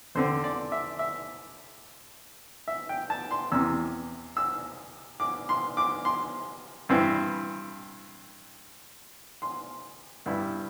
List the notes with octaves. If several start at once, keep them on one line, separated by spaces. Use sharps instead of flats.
E2 D3 C4 C5
D5
E5
E5
E5
G5
A5
C6
E2 C3 E3 E6
E6
D6
C6
D6
C6
G2 E3 C4 E4
C6
G2 G3 E4